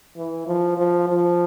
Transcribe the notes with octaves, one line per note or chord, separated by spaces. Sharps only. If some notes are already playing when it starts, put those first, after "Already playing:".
E3
F3
F3
F3